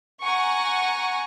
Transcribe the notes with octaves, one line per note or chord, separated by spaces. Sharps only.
F#5 G#5 A#5 C#6